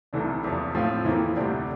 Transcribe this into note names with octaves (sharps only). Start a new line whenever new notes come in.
C2 C3 E3 A3 D4
E2 C3 F3
A2 F3 C4 F4
F2 E3 A#3 E4
D2 C3 G3 D4